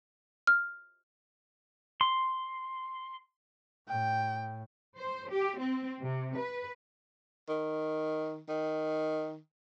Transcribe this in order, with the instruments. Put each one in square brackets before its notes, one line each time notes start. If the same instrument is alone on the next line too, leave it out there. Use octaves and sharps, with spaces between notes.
[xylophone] F6
[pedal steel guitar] C6
[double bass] A2 [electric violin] G5
[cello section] C5
G4
C4
C3
B4
[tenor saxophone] D#3
D#3